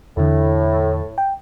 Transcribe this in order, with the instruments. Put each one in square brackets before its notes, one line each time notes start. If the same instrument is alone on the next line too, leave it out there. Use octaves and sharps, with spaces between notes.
[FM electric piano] E2 D3 [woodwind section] A2
[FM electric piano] G5